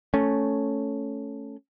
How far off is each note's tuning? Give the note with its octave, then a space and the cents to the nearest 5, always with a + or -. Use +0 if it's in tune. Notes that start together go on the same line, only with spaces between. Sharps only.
A3 +0 C#4 +0